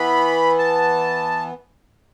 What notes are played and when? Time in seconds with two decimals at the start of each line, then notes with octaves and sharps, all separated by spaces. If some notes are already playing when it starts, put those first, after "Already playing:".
Already playing: E3 B3 B5
0.59 A5